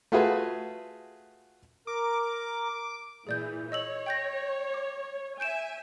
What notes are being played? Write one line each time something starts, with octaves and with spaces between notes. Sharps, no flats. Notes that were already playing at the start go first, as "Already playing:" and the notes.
A3 F4 F#4 G#4 B4
A#4 D6
A#2 E3 G#4 D5 G6
C#5 D#5 E6 F#7
G5 G6 A#6
D6
E5 G#5 G6 D7 E7